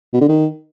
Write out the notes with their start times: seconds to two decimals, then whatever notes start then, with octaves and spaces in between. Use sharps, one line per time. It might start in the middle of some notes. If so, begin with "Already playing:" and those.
0.14 B2
0.21 D3
0.28 D#3